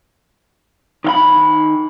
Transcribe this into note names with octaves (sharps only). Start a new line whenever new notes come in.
D#3 F5 B5